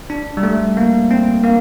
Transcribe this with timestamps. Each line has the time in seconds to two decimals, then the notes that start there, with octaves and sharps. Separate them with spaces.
0.10 D4
0.37 G3
0.43 A3
0.77 A#3
1.11 C4
1.44 A#3